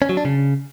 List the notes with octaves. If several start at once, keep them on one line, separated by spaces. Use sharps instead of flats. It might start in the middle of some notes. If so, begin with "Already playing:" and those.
C#4
F#3
D4
C#3